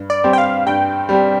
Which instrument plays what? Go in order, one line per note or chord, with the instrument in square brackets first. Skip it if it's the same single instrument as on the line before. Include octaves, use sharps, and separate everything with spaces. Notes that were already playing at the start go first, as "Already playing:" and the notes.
Already playing: [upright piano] G2
[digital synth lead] D5
[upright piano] G3 C4 G4
[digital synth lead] G5
F5
[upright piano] G2 [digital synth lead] G5
[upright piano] G3 C4 G4